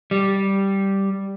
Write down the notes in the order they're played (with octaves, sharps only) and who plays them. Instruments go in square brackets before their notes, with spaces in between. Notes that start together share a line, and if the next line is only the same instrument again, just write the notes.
[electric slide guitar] G3